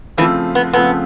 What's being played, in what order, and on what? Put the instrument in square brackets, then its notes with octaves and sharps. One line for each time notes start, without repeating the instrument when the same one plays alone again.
[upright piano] C#3 F3 A3 C4 F4 [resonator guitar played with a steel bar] E3
[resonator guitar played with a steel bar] B3
[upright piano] C#3 F3 A3 C4 F4 [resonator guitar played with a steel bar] B3